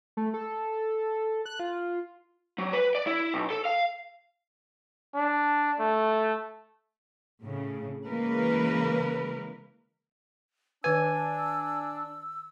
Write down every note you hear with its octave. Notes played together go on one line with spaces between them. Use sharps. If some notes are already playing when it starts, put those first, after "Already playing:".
A3
A4
F#6
F4
F#3
B4
D5
E4
B1
A4
F5
D4
A3
A2 C#3
C#3 E3 G#3 A#3 A#4 B4
D#3 D4 B4 G#5 E6